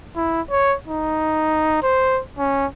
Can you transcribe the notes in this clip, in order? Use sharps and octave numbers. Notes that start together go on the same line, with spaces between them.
E4
C#5
D#4
C5
C#4